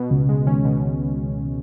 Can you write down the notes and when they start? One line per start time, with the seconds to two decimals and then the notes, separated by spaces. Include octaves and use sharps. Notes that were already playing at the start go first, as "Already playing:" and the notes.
Already playing: B2
0.11 C#2 C#3
0.29 G#3
0.47 D#3 C#4
0.65 B2